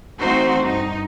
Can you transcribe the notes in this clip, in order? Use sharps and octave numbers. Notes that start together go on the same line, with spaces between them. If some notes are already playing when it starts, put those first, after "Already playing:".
E3 A3 C4 D#4 F#4 C5
G2 D#4